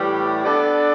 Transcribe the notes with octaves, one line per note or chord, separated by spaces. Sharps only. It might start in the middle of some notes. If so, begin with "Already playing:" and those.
Already playing: A2 E3 G3
B3 D4 A4 D5